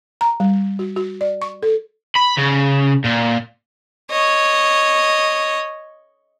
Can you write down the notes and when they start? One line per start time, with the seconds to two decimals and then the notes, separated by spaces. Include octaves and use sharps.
0.21 A#5
0.40 G3
0.79 F#4
0.96 F#4
1.21 D5
1.42 C#6
1.63 A4
2.15 B5
2.37 C#3
3.04 A#2
4.10 C#5 D#5